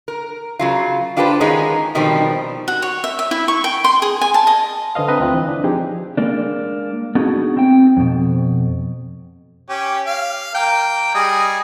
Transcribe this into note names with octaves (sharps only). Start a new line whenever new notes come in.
A#4
C#3 F#3 F4
D4 F4 G4 A4 B4 C5
D#3 G#3 B3 C#4 D#4
B2 D#3 F3 G3 C4
F#4
C#5
E5
E5
E4
C#6
G5
C6
G#4
G#5
A5
D#5
D3 B4 C5 D#5 F5
C4 B4 D#5 E5 G5 A#5
D2 D3 C4 F4 F#6
E3
D4
F3 C4 D#4 G4 G#4
G#3 A#3 D4
B3 D4 D#4 F#4 G#4
C4 G5
F2 B2
C#4 G4
F5
A#3 A#4 G5
G3 G#4 D#5